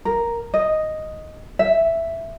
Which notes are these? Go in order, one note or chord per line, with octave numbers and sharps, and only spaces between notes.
A#4
D#5
E5